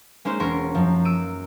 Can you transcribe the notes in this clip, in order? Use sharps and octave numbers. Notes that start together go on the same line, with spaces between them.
G#3 A#3 C#4 D#4 C5
E1 C#4 A#4 C6 C#6
F#2 F3
E6 D7 D#7